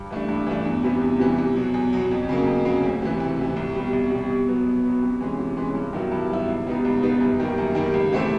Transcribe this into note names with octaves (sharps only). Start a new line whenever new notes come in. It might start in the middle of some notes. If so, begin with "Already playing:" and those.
Already playing: G2
E3 A3 D4
G2
E3 A3 D4
E2
C3 E3 G3
E2
C3 E3 G3
E2
B2 F#3
E2
B2 F#3
F2
C#3 F#3 A#3
F2
C#3 F#3 A#3
D2
C3 E3
D2
C3 E3
C2
B2 G3
C2
B2 G3
B2
F#3 B3
B2
F#3 B3
C3
E3 G#3 C#4
C3
E3 G#3 C#4
G2
D#3 F#3 B3 E4
G2
D#3 F#3 B3 E4
C#2
B2 G3 B3 D#4
C#2
B2 G3 B3 D#4
F#2
D#3 G3 A#3
F#2
D#3 G3 A#3
C#2
C3 E3 A3 C4